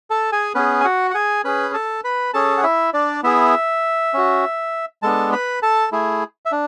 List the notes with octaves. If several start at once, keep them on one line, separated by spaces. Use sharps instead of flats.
A4 A5
G#4 G#5
B3 C#4 G#4 B4
G#5
F#4 F#5
F#5
G#4 G#5
C#4 G#4 B4 B5
A4 A5
B4 B5
C#4 G#4 A4 A5
F#5
E4 E5
D4 D5
B3 E4 G#4 E5
C#4 F#4
G#3 B3 D4 A4 A5
B4 B5
A4 A5
A3 E4 G#4
E5
D4